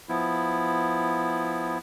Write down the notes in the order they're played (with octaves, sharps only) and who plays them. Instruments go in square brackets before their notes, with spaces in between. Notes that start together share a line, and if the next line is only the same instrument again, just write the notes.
[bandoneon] F3 B3 E4